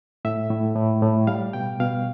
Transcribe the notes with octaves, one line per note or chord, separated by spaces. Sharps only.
A2 E5
A2
A2
A2
G3 F5
B2 G5
B2 F5